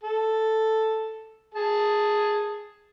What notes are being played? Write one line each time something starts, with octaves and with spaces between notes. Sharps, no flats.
A4
G#4 A5